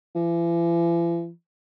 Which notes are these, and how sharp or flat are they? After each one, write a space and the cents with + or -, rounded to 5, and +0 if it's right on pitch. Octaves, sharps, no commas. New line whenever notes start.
E3 +45